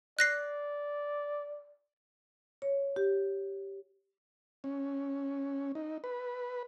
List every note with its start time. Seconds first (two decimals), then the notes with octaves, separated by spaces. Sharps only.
0.19 D5 F#6 A#6 C7
2.62 C#5
2.96 G4
4.64 C#4
5.75 D#4
6.04 B4